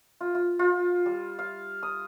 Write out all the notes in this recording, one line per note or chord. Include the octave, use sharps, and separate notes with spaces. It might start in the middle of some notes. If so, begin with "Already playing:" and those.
F4
F4
F4
G3
F5
D#6